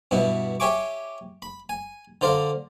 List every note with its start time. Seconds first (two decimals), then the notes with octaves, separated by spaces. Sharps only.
0.11 G2 B2 B3 E4
0.60 G4 C#5 E5 G#5 C#6 D6
1.42 B5
1.69 G#5
2.21 D3 C5 D5 F5 A#5